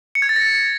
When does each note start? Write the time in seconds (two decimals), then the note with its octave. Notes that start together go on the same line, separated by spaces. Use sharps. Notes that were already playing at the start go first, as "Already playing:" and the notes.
0.15 C#7
0.22 G#6
0.29 A6
0.36 A#6